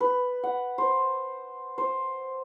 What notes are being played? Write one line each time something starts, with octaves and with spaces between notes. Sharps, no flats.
B4
F#5
C5
C5